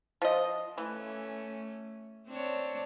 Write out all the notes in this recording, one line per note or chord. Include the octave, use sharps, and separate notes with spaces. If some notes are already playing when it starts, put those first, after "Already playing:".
F3 D#5
E3 A3 C#4
C4 D4 C#5